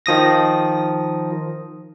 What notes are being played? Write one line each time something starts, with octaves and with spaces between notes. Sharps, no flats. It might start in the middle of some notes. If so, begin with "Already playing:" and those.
D#3 F3 D#6 A#6